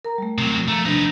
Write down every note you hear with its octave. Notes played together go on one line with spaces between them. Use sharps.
A#4 A#5
G3 A3
C3 F#3
F3 A3 A#5
C3 D4 D#4 B4